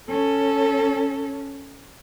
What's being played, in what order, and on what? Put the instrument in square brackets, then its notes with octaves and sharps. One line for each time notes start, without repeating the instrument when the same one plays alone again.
[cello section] C#4 [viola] A4